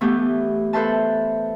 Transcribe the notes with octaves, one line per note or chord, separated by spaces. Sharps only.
E3 A3 B3 G4
A4 B4 C5 E5 A5